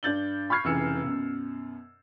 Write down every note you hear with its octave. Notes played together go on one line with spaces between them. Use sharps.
G2 D4 G6 A6 F#7 G7
B5 C#6 F6 G#6 C7
F1 C#3 E3 E6 C#7
F#2 B2